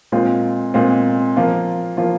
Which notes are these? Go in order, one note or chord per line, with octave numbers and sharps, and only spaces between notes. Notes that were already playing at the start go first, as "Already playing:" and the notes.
A#2 G#3 C4 F4
A#2 G#3 C4 F4
F3 A#3 F4
F3 A#3 F4